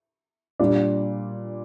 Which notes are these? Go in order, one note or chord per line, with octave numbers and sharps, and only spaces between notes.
A#2 G3 D4